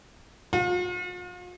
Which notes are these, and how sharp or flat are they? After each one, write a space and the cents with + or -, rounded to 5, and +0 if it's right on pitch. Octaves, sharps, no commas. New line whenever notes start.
F4 +45